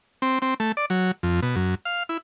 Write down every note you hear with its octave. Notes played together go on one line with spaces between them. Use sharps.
C4
C4
A3
D5
F#3
F2
B2
F#2
F5
E4